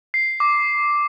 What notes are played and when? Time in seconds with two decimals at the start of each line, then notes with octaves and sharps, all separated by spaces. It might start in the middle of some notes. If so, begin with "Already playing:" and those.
0.14 C7
0.40 D6